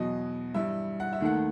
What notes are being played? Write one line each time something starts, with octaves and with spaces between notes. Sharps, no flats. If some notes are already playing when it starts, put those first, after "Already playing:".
Already playing: E2 B2 F#3 D#5
G2 E3 G3 E5
F#5
E5
D#2 D#3 A3 F#5